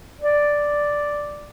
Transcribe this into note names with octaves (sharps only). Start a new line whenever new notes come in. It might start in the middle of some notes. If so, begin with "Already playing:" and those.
D5